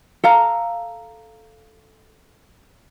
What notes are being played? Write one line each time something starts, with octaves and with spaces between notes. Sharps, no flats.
A4 F5 A#5